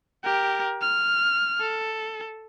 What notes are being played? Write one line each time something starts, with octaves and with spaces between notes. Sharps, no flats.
G4 A#4
F6
A4